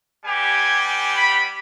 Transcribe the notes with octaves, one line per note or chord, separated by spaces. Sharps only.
G3 B3 G4 G#5
G#5
B5